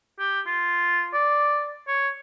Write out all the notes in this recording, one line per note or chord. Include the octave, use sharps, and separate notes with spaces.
G4
F4
D5
C#5